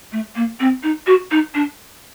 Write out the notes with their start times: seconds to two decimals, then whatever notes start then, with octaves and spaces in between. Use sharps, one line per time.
0.12 A3
0.36 A#3
0.60 C4
0.83 D#4
1.07 F#4
1.31 D#4
1.54 D4